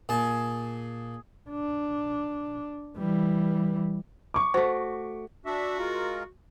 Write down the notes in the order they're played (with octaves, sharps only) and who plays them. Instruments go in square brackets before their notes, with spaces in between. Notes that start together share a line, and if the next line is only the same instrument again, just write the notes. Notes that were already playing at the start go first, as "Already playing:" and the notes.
[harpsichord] A#2 A5 [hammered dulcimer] G#4
[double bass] D4
E3 G3
[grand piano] C#6 D6
[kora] A3 F#4 [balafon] C5
[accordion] D4 E5 [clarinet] F#4
[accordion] G#3 F4 A#4